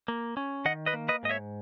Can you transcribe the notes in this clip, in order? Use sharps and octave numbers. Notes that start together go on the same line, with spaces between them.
A#3
C#4
D#3 D#5 F#5
B4 D#5
A#3
B4 D#5
G#2 D#5
C#5 E5